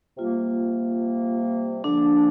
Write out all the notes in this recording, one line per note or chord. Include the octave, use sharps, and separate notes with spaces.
C3 G3 A#3 F4
D3 F3 A#3 D4